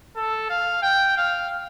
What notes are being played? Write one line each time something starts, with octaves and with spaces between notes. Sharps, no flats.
A4
F5
G5
F5